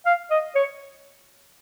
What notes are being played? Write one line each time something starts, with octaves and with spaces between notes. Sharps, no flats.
F5
D#5
C#5